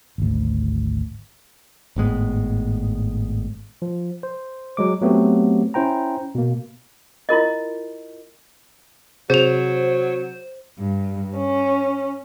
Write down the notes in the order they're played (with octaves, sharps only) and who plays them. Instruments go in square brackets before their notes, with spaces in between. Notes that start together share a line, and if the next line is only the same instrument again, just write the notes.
[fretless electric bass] G#1 D2
[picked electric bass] G#1 A2 G#3 B3
[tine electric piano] F3
C5
F#3 G#3 D6
F#3 A3 B3 C4 F#4 G4
C#4 E4 C5 G5 A#5
B2 A#3
[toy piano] E4 F4 A#4 D#5
[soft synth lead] C3 [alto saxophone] F#3 [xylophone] G#4 F7 [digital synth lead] C5
[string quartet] G2
C#4